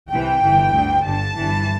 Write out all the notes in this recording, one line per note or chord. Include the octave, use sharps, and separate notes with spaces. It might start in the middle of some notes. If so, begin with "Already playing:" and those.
C2 C3 E3 G5
G1 G2 E3
D2 D3
G1 G2 D3 A5
G1 G2 E3